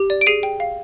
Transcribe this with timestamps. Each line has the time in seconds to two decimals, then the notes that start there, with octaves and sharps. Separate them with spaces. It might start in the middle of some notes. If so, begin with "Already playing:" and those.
Already playing: G4
0.10 D5
0.21 D7
0.27 G#4 C7 D#7
0.43 G5
0.60 F5